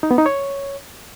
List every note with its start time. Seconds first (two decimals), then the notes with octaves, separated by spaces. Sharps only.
0.03 D#4
0.11 B3
0.18 D#4
0.26 C#5